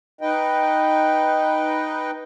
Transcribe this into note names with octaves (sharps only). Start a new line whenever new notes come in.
D#4 B4 D#5 G5